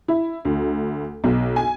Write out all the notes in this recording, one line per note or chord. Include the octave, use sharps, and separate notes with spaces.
E4
D2
B1
G#5